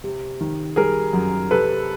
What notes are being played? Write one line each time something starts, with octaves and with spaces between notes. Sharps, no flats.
C3
D#3
G3 G#4 A#4
F#2
C3 A4 B4